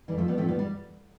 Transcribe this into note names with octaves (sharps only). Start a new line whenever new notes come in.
F2 E3 G3
F3 A3
G3 B3
A2 F3 A3 C4
G3 B3
G3